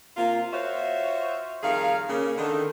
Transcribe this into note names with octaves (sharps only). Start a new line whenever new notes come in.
C3 A#3 C4 F4
F4 F#4 C5 C#5 E5 F5
F2 D#3 G3 G#4 F5
C#3 A#3
D3 D#3